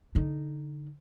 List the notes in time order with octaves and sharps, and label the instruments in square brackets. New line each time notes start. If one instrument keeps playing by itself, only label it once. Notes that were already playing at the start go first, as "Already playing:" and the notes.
[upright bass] D3 D#4